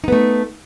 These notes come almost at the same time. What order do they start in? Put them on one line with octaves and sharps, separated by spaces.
D#4 B3 A3